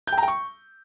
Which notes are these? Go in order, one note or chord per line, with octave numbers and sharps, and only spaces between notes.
G6
G5
A#5
G5
C#6